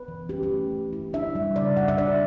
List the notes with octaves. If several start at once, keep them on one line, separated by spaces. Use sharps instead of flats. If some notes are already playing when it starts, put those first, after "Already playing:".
Already playing: B4
E3
C#4 G4
G4
A3
E3
E4
D4 E5
G3
C#3 D5
C#3 F#5
E5
D4 D5